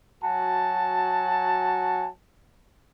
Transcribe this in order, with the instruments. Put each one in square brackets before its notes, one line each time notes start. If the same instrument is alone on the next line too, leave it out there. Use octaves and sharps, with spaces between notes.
[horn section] F#3 F#4 G#5 A5